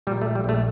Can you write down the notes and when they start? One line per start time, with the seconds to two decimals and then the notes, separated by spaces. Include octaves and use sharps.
0.07 A#2 G3
0.21 A3
0.25 A#1
0.35 G3
0.44 A#1 A3